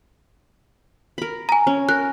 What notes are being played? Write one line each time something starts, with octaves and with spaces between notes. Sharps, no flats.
A#4 B5
G#5 A#5
C#4
A#4 F#6